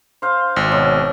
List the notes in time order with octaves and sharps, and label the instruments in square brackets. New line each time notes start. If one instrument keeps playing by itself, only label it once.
[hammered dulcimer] C5 F5
[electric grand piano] G#1
[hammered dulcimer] B2 F#3